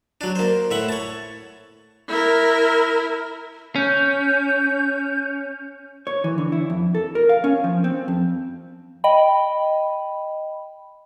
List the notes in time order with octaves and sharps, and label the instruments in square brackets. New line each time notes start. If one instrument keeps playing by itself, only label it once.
[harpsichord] F#3 D4
A#3 C5
A2 E5 F#5
C#5 A5
[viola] E4 A#4
[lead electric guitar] C#4 [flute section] G6
[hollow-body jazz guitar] C#5
E3
D3
E4
F2
A4
A#4
F5
C#4
F3
C4
F2
[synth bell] D#5 G5 B5